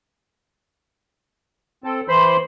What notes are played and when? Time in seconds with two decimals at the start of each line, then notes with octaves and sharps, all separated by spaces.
1.84 C4 A4
2.08 E3 C5 B5 C6